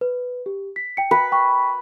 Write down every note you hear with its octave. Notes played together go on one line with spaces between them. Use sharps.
B4
G4
B6
G5 C#7
B4
G5 C#6